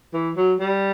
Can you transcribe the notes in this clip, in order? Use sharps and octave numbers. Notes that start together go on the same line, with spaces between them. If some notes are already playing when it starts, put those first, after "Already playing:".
E3
F#3
G3